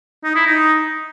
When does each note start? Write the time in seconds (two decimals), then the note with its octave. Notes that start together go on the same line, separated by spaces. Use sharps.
0.24 D#4
0.35 E4
0.46 D#4